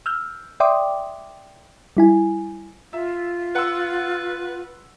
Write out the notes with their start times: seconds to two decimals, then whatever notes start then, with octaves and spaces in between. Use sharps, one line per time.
0.06 E6 F6 G6
0.60 D5 E5 G5 C6 D6 D#6
1.97 G3 E4 G#5
2.93 F4 E5
3.55 B4 F#5 C6 E6